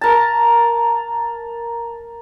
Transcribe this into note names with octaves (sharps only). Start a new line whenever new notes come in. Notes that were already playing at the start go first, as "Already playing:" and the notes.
A#4 A5